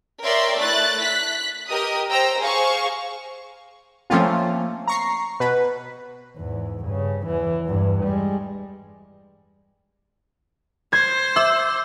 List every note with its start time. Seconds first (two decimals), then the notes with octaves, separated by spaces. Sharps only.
0.24 A#4 C#5 D5 E5 G5 C6
0.60 A3 E4 F#6 A6
1.02 F#6 B6
1.69 G4 A#4 D#5 D#6
2.10 C5 G5 A#5 E6
2.39 G#4 C5 F5 C#6
4.10 F3 A3 A#3 C4 C#4 F4
4.87 A#5 C#6 C7
5.40 B2 B4
6.37 E2 G#2
6.85 G2 C#3
7.26 E2 E3
7.65 E2 G2
8.04 G3 G#3
10.93 C5 G#6
11.36 E5 D6 E6